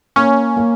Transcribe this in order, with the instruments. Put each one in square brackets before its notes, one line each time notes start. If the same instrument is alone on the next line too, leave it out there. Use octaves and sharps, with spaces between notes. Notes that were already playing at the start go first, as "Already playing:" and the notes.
[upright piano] A#3 [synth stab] C#4
[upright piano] A#3